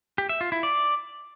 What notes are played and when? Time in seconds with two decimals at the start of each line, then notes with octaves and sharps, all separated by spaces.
0.18 G4
0.29 E5
0.41 F4
0.52 E4
0.63 D5